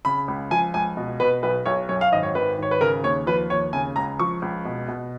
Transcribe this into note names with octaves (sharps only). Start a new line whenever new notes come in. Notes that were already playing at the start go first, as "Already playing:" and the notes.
C#3 B5
C#2
F3 G#5
C#2 G#5
B2
B2 B4
B1 B4
B1 C#5
F#2 C#5
F5
G#1 D#5
C#5
D#3 B4
G#1 C#5
B4
C#3 A#4
D#2 C#5
F3 B4
D#2 C#5
C#3 G#5
C#2 A#5
F3 C#6
C#2
B2
B2